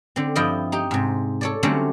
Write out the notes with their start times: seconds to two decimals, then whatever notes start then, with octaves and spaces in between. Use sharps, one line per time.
0.16 D3 C4
0.35 G2 F3 E4 D#5 G5
0.72 D#4 G4
0.91 G#2 C3
1.41 A4 C#5 D5
1.63 D3 F#3 G3 A3 C4 C#4